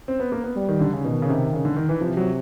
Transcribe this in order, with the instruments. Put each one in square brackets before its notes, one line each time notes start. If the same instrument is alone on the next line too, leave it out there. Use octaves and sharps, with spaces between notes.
[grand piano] C4
B3
A#3
B3
[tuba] G3
[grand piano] D#3
D3
C#3
[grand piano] B2 [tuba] D#3
[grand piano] C#3
C3
C#3
D3
D#3
E3
[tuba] C3 [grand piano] F3
[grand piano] F#3